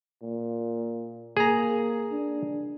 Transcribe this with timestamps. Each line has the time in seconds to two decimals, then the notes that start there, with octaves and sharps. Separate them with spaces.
0.23 A#2
1.37 A#3 G#4 A#5
2.11 D4